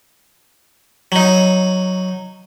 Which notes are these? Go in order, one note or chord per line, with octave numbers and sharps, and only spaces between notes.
F#3 D#4